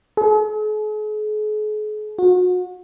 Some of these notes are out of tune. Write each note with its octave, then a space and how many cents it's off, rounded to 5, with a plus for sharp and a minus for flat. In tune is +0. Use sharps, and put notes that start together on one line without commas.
G#4 +45
F#4 -35